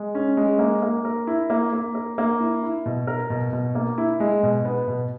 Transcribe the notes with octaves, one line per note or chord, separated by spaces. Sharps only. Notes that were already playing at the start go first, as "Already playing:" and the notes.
Already playing: G#3
C#4
G#3
A#3
A#3
A#4
E4
A#3
A#3
A#4
A#3
E4
E4
B2
A#4
B2
B2
A#3
E4
G#3
B2
B3
B2